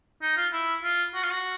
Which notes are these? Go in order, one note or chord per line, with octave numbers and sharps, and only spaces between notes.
D#4
F4
E4
F4
F#4
F4
F#4